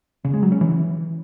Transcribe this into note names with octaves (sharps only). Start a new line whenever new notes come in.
C#3
G#3
F#3
C#4
E3